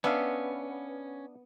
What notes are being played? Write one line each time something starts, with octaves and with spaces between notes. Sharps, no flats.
B3 C#4 D4 E5 F5